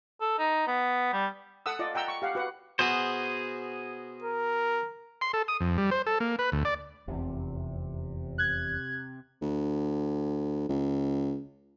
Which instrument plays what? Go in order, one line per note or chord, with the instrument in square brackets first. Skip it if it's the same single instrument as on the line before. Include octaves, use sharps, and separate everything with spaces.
[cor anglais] A4
D#4
B3
G3
[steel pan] A4 F#5 D#6 E6
F4 D5 D#5
F#5 G5 A#5 E6
C#6
G4 F5 F#5
F#4 B4 F#5
[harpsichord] B2 F#4 [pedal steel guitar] G#4 C5
[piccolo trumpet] A#4
[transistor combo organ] C6
A4
D#6
F2
G3
C5
A4
A#3
B4
D2
D5
[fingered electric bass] F1 E2 [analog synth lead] C3
[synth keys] F#6 G#6
[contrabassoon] D2
C#2